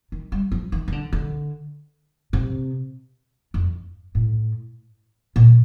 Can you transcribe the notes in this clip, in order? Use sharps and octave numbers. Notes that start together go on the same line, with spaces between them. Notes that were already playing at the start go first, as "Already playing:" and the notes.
D#3
G3
F3
D#3
D#3
D3
D3
C3
F2
A2
A#2